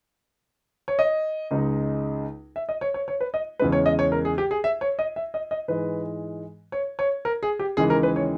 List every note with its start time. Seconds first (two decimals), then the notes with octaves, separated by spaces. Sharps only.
0.88 C#5
0.99 D#5
1.51 C#2 C#3 G#3 D#4
2.56 E5
2.69 D#5
2.81 C#5
2.94 C#5
3.08 C#5
3.21 B4
3.34 D#5
3.59 E2 C#3 G#3 B4
3.72 C#5
3.86 D#5
3.99 C#5
4.12 A#4
4.25 G#4
4.38 G4
4.51 G#4
4.64 E5
4.81 C#5
4.99 D#5
5.16 E5
5.34 D#5
5.51 D#5
5.68 G#2 E3 G#3 B4
6.72 C#5
6.99 C#5
7.25 A#4
7.43 G#4
7.59 G4
7.77 D#2 C#3 E3 G#3 G#4
7.90 A#4
8.03 B4
8.16 C#5